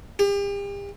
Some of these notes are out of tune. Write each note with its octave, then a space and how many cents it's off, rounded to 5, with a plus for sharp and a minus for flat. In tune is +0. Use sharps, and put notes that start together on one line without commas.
G4 +40